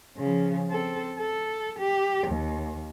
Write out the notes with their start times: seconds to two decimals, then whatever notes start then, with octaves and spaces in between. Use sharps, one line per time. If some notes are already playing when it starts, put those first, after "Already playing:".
0.17 C#3 F3
0.68 C4 A4
1.20 A4
1.79 G4
2.27 D#2